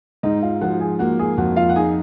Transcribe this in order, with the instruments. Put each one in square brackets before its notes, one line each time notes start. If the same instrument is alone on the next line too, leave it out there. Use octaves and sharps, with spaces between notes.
[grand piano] G#2 [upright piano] D#4 D#5
[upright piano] F4 F5
[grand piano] F3 [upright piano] F#4 F#5
[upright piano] G#4 G#5
[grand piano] A#3 [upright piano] F#4 F#5
[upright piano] G#4 G#5
[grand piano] F2 [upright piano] F#4 F#5
[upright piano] F4 F5
F#5
[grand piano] D#4 [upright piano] G#4 G#5